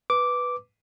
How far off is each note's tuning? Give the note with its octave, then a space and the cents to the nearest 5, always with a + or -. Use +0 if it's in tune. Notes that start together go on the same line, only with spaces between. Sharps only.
B4 +0 D6 -5